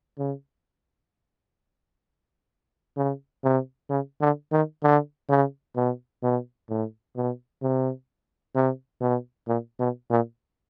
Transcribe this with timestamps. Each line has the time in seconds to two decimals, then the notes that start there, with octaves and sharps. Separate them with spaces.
0.18 C#3
2.97 C#3
3.44 C3
3.90 C#3
4.21 D3
4.52 D#3
4.83 D3
5.29 C#3
5.76 B2
6.23 B2
6.69 A2
7.16 B2
7.62 C3
8.56 C3
9.01 B2
9.48 A#2
9.80 B2
10.10 A#2